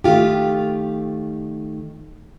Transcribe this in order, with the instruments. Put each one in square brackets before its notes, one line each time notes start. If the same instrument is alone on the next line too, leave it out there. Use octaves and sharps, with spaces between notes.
[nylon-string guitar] D#3 A3 F4 G4